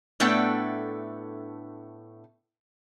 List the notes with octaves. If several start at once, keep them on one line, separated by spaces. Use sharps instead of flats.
A2 A3 B3 D4 A4 G5